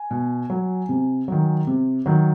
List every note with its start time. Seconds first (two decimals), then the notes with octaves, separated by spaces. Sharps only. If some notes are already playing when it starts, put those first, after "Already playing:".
Already playing: G#5
0.11 B2
0.50 F#3
0.89 C3
1.28 D#3 F#3
1.67 C3
2.06 D#3 F#3